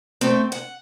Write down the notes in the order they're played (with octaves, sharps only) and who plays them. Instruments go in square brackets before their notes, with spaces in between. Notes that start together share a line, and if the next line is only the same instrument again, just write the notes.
[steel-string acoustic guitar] A3 C4
F#5